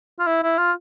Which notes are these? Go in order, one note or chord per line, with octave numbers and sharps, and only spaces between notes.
F4
E4
E4
F4